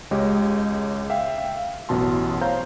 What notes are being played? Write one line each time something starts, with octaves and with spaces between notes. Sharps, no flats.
C#2 G#3 G4 C#5 D#5
E5 F5 G5
A1 F#2 B2 A5 C6
C5 C#5 F5 A#5 G6